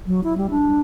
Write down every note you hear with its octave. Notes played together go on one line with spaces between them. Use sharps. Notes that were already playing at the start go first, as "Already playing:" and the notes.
F#3
E4
G3
D4